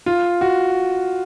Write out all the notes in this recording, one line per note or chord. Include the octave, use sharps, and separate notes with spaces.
F4
F#4